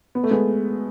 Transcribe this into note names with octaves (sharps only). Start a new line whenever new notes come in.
B3
A3
G#3 B3